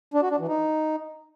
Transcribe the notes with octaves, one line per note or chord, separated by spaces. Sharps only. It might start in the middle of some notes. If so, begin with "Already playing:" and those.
D4
F#4
D4
E3
D#4